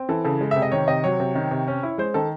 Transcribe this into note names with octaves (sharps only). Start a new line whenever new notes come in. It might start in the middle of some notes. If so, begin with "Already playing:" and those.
Already playing: C4
E3 A4
C#3 A4
G#3
C3 E5
D#5
D#3 C#5
C3 D#5
F#3 C#5
C3
D#3
C3
C#4
E4
G#3 C5
D#3 A4